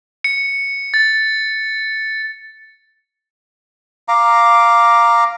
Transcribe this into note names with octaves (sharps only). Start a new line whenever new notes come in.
C#7
A6
F5 A#5 D6